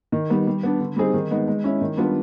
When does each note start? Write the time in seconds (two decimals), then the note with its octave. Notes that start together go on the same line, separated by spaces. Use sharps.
0.12 D#3
0.30 G3 B3 D#4
0.47 G3
0.63 B3 D4
0.80 D3
0.96 G3 C4 D#4 G#4
1.14 D#3
1.31 G#3 B3 D#4
1.48 G#3
1.64 C#4 E4
1.81 D#3
1.97 G3 B3 D4 F4